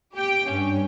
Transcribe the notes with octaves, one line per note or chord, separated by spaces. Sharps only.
G4 G5
G2 C#4